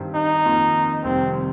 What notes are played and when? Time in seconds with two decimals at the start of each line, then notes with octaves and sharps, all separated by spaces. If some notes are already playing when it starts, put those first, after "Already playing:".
Already playing: G2 D#3 C4 G4
0.15 D#4
0.45 F2 D#3 A#3 F4
1.04 F1 F2 C3 D#3 G3 C4